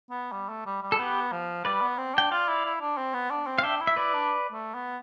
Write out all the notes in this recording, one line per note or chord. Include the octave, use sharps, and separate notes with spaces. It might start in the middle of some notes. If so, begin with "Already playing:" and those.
B3
G3
A3
G3
G3
A4
B3 G4 B4
F3
G3 B4 D5
B3
C4
D4 G5
F4 D5 F5
E4
E4
D4
C4
B3
D4
C4
F5
D4 E5 G5
E4
E5
E4 B4 D5
D4
A3
B3